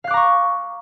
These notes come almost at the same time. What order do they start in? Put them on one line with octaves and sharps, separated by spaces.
F5 F#6 D6 A#5 C#6